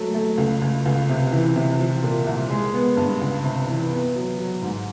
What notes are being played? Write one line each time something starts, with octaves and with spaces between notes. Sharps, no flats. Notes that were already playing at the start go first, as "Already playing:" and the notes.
Already playing: F#3 A3
A3
C#2
C#2
C#2
C3
E3
C3
F3
A#2
C2
G#3
B3
G2
C#2
C3
E3
B3
F#3
F#3
G#2